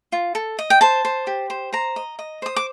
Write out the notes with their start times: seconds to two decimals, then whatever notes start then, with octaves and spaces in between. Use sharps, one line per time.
0.12 F4
0.35 A4
0.59 D#5
0.70 G5
0.81 C5 A5
1.05 C5
1.27 G4
1.50 C5
1.73 C5 A#5
1.96 D#5
2.19 D#5
2.42 C5 D#6
2.56 D6